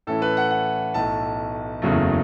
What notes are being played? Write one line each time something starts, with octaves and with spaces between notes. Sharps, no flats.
A2 E3 C#4 E4 A4
B4
F#5
F#5
B1 A2 A3 A5
F#1 E2 C#3 F#3 A3